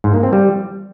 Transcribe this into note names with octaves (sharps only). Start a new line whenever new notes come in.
G#2
A#3
C4
G3